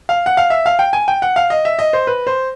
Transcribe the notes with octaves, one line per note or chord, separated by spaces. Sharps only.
F5
F#5
F5
E5
F5
G5
G#5
G5
F#5
F5
D#5
E5
D#5
C5
B4
C5